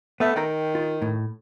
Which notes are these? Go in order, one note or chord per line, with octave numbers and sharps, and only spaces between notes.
A3 B3 E5
D#3 G5 A#5
F4
A2